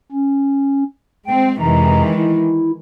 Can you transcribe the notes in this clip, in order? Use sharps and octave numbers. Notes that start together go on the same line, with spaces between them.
C#4
G#3 C4 G5
F2 C3 D#3 E3 G#3 A#5
E4